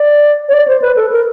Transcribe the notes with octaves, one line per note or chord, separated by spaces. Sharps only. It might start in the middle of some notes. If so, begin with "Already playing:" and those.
Already playing: D5
C#5
D5
C5
B4
A4
A#4